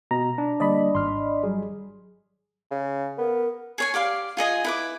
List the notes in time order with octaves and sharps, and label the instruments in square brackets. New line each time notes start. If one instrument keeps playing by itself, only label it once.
[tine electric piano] B2 [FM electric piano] A#5
[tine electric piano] D4
[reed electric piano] D3 G3 A#3 [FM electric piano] D5 D#5 B5
[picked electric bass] G#1 [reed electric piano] C6 F6
[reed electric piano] F#3 G3 G#4
[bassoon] C#3
[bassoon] B3 [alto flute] A#4
[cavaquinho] G#4 C#5 G#5
G4 D5 F5 C6
F4 G#4 D#5 G#5
E4 B4 D6